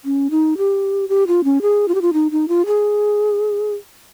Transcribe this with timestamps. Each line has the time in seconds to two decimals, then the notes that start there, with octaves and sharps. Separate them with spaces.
0.05 C#4
0.31 D#4
0.58 G4
1.09 G4
1.27 F4
1.44 C#4
1.62 G#4
1.88 F4
1.95 G4
2.02 F4
2.13 D#4
2.31 D#4
2.48 F4
2.66 G#4